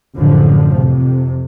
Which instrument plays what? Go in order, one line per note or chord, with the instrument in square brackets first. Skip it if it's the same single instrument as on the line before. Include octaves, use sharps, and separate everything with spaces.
[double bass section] A1 F#2 A2 D3 F3
F2 C3